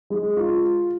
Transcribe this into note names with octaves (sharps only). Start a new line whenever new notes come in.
G#3
F4